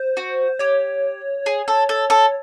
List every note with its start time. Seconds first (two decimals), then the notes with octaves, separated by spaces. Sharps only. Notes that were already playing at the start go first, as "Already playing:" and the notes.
Already playing: C5
0.17 F#4
0.59 G4 C#5
1.46 G#4
1.68 A4
1.89 A4
2.10 A4